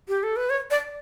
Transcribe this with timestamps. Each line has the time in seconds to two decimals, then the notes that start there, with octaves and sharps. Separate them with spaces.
0.09 G4
0.23 A4
0.36 B4
0.50 C#5
0.71 D5